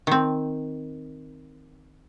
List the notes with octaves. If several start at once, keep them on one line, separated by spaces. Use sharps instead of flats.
D#3 C4